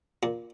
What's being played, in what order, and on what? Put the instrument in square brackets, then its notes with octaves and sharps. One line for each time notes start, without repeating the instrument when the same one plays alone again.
[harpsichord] A#2